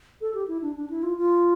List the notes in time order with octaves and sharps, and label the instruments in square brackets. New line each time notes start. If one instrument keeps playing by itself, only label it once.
[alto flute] A4
G4
E4
D4
D4
E4
F4
F4